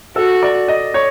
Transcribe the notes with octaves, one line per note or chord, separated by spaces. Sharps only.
F#4 A4
D5
D#5
C#5